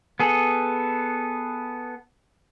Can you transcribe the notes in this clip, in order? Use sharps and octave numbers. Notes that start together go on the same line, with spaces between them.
B3 G#4 A4